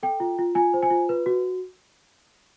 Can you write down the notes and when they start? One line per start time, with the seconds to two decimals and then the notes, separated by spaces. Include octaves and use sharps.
0.03 A4 G5
0.20 F4
0.39 F4
0.55 F4 G#5
0.74 C5
0.83 G#5
0.90 F4
1.09 B4
1.26 F#4